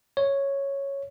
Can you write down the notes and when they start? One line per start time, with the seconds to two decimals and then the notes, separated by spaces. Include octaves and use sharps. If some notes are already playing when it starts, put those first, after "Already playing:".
0.17 C#5